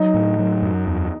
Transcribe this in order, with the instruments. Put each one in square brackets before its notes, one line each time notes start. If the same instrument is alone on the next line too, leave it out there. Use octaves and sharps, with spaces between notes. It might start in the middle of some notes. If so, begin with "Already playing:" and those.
Already playing: [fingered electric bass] F#3 [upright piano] D#4
[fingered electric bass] A2
F#3
F#2
E2